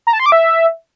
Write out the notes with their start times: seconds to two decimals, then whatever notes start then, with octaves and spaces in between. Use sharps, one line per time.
0.07 A#5
0.13 A5
0.19 C6
0.26 D6
0.32 E5